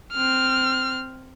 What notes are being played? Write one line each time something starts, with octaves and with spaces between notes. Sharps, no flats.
C4 F6